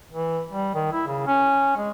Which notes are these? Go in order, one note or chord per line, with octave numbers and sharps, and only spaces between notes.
E3
G3
D#3
E4
C#3
C#4
G#3